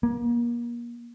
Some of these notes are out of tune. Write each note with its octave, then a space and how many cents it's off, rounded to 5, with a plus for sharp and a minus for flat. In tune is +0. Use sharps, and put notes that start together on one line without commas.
A#3 +35